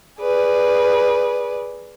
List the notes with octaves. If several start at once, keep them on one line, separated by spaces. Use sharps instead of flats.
G#4 B4 D5